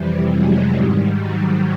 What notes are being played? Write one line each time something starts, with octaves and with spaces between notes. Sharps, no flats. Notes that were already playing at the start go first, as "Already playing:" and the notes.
Already playing: F2 C3 E3 G3
F#3 G#3
G#2 D#3 G3
F#3